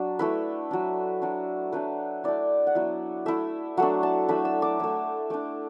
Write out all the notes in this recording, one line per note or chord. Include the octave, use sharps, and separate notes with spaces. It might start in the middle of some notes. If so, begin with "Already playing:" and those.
Already playing: F#3 D4
A3 E4 B4
F#3 D4
F#3 D4
F#3 A3 D4 B4
A3 E4 D5
F#5
F#3 B3 E4 E5
A3 E4 E5
F#3 A3 D4 F#5
A5
F#3 A3 D4 B5
E6
D6
A3 E4 E6
A3 D4 D6